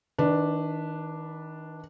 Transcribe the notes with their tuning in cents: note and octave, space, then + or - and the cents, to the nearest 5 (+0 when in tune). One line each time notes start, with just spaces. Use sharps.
D#3 +30 D4 +0 B4 +0